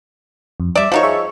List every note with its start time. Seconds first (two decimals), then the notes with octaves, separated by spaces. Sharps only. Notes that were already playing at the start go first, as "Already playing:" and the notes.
0.60 F2
0.75 G3 D5 E5 D6
0.92 F3 D#4 F4 F#4 A#4 C#5
1.03 G#4 E5 C#6